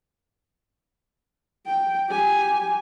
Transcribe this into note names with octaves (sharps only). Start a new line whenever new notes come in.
G5
G4 G#5